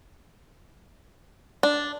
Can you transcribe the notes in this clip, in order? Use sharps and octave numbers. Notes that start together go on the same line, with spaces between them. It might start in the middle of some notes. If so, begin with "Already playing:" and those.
D4